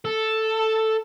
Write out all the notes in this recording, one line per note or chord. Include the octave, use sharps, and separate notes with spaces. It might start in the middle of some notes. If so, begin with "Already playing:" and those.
A4